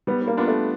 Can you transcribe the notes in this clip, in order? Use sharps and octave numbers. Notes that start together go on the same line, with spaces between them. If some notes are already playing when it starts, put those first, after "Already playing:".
G3 B3
B3
A#3
B3 D4 F4
A3